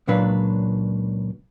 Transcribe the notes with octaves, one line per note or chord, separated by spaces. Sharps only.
C#2 A#2 F#3 D4 B4 F5